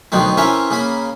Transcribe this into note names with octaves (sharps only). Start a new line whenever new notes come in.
D2 B2 D#3 F#3 C4
E3 C4 C#4 A#4 E5
C#3 A#3 B5